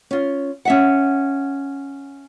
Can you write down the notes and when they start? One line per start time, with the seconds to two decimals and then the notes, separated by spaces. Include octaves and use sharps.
0.11 C#4 F4
0.65 C#4 E5 F#5